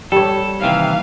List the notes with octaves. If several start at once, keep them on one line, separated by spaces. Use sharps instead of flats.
G3 A4 C#5
D#2 C3 E3 F5